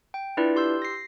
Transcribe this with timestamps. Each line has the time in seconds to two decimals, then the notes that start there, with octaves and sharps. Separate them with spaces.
0.14 G5
0.37 D4 E4 F4 B4 D5
0.56 G4 C6 E6 G6
0.82 A#6 C7